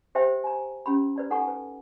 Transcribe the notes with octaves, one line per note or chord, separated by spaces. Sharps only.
G4 C5 E5 G5
G#5 A#5
C#4 G4 A#5 B5
B4 D5 A#5
D#4 A4 F#5 G#5 A#5 C#6
B4